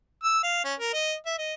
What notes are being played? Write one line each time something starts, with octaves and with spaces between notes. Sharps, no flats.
E6
F5
C#4
A#4
D#5
E5
D#5